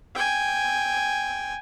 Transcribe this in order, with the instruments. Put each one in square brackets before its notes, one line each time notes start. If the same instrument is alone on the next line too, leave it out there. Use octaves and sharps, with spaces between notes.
[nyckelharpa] G5 G#5